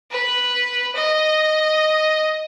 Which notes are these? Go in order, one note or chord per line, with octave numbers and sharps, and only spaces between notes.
B4
D#5